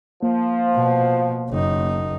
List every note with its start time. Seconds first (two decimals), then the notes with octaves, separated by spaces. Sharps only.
0.23 F3 A#3
0.74 B2
1.49 F#1 D#4